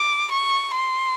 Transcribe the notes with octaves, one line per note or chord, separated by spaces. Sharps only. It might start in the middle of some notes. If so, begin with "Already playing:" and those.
Already playing: D6
C#6
C6